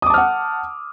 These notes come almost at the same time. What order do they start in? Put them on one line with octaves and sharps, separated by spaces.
D#6 D6 A5 F6 F#5